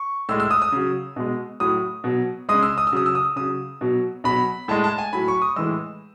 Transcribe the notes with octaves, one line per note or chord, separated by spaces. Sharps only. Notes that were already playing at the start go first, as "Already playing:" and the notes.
Already playing: C#6
A2 G#3 E6
E6
D#6
D#6
C#3 F#3
B2 G#3
A2 F#3 D#6
B2 F#3
C#3 G#3 D#6
E6
D#6
E6
C#3 F#3 D#6
E6
D#6
C#3 F#3 D#6
B2 F#3
B2 F#3 B5
A2 G#3 A5
A5
G#5
A2 F#3 B5
C#6
D#6
A2 E3 G#3 E6